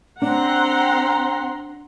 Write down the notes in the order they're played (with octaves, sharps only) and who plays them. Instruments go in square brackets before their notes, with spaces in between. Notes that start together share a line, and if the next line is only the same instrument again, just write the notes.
[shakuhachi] C4 [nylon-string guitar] D4 [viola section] F#5 A#5 C6